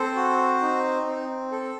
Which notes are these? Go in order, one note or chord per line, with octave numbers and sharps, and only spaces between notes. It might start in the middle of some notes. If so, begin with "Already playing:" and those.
Already playing: C4 A4 C5
F#4
D#4
C4
A4